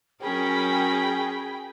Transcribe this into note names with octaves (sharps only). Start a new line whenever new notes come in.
F#3 C#4 G#4 A#4 G5 B5